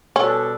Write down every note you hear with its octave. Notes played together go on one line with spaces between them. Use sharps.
B2 G3 C#4 D4 A4